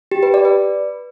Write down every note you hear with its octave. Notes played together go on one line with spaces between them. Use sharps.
G4
B4
D5
B4